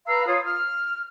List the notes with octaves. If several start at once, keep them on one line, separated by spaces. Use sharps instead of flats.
B4 F5 A#5 E6
F4 C#5 F5 D#6
F6